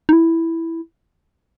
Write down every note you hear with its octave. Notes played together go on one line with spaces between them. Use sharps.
D#4
E4